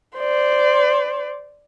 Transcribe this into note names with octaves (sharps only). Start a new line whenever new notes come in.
C5 D5